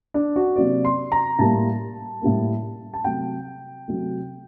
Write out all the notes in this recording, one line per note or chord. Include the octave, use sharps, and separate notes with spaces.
D4
F#4
C3 F#3 A#3 D5
C6
A#5
A2 G3 A#3 A5
A2 G3 A#3
A5
C3 F#3 A3 G5
C3 F#3 A3